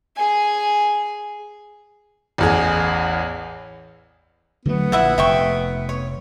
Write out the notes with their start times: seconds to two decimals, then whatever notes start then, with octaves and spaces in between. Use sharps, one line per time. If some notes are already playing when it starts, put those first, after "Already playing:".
0.16 G#4 G#5
2.38 A1 E2 G#4
4.65 D3 F#3 A3 B3
4.92 A#1 E4 E5 F#5
5.18 F1 E5 G5 C#6
5.89 C#5